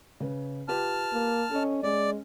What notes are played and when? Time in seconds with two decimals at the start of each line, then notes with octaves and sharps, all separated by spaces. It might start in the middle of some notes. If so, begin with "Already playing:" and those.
0.20 C#3 B4
0.68 F4 G4 B4 A5 F6
1.13 A#3
1.51 C#4 A4 D#5
1.83 G#3 C#4 D5